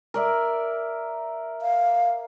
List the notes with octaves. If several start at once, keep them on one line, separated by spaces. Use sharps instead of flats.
A#4 D5 E5
F5